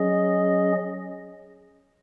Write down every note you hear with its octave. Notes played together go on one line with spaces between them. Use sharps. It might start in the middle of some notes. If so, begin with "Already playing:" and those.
Already playing: F#3 C#4 G#4 D#5